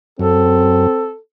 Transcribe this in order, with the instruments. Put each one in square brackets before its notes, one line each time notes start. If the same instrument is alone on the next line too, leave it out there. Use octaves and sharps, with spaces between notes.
[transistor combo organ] F#2 [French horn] C4 [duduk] A4